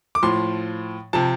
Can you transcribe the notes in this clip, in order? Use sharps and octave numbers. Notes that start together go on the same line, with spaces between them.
D6
A2 F3 C6
C3 F3 A5